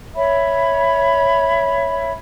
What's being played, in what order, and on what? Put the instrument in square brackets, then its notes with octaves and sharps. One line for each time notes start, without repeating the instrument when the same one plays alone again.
[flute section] C#5 E5 B5